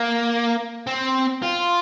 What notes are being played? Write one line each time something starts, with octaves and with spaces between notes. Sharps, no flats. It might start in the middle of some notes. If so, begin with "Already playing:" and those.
Already playing: A#3
C4
F4